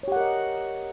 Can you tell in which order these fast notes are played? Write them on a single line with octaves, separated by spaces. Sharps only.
C#5 G4 F#5 A#4 D#5